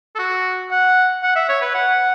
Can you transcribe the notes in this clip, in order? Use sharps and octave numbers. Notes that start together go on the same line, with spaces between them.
A4
F#4
F#5
F#5
E5
C#5
B4
F#5